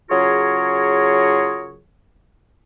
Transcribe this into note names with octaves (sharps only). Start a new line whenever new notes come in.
C#3 F#3 F4 G#4 A#4 C#5